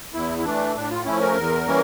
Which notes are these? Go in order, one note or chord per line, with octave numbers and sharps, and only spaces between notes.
E2 E4
E4
E3 A3 D4
A2 D4
F4
F3 A3 C#4 E4
A#4
E2
E3 G3 A#3 C#4